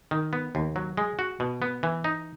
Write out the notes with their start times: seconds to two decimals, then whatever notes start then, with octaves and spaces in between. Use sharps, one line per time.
0.11 D#3
0.33 B3
0.55 D#2
0.76 F#3
0.97 G#3
1.19 F#4
1.40 B2
1.62 B3
1.83 E3
2.04 D#4